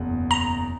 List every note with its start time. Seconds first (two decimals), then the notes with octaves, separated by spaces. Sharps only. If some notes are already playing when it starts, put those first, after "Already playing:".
Already playing: F#1 E2 B2
0.31 A#5